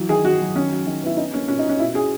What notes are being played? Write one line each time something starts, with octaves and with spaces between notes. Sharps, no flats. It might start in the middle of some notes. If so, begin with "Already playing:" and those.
Already playing: E3 F#3
D#3 G#4
D#3 F#4
F#3
D#3 C#4
F#3
D#3
B3 E4
C#4 D#4
A#3 C#4
A#2 C#4
D#4
A#2 C#4
B2 E4
C#4 G#4